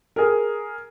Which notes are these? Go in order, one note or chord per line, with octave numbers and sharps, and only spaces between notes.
G#4 A#4